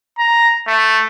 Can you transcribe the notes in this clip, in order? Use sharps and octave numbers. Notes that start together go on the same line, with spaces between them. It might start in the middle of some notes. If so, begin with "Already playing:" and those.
A#5
A3